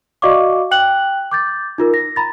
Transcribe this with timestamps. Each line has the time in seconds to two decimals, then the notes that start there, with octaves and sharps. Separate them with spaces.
0.22 F#4 D5 D#5 F5 C#6 D6
0.71 G5 F#6 F#7
1.31 D6 G6 A6
1.78 D#4 F4 A#4
1.94 A#6
2.16 A#5 B5 A6